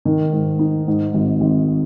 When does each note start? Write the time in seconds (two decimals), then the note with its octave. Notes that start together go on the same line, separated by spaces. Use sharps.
0.05 D#3
0.32 G#2
0.59 D#4
0.88 G#2
1.14 G#1
1.41 G#1